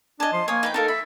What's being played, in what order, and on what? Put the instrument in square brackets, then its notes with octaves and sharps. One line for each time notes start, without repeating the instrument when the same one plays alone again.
[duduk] D4 [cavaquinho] D#5 A5 [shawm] G#5
[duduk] F3 [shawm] C6
[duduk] A#3 [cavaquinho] C#5 D#6 [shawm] G#5
[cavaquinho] D#4 B4 G5
[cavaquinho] D#4 A#4 F5 [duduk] A4 [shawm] A5
[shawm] E5 [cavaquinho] B5